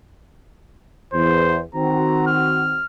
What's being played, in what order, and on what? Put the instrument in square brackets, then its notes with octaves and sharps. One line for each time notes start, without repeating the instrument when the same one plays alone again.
[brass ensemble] E2 [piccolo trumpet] C5
[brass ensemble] D#3 C4 F#4 [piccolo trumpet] A#5
[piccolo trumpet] F6